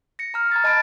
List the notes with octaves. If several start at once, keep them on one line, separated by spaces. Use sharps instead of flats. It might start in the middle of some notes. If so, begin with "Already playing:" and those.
A#6 C#7
A#5 F6
A#5 G#6 A6
D#5 A5 B5 A6 D7